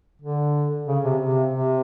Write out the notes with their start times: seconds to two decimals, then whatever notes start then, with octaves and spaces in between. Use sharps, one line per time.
0.22 D3
0.88 C#3
1.04 C3
1.21 C3
1.53 C3